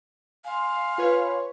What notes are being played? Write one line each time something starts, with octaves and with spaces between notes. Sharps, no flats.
F5 G#5 C6
F4 B4 C#5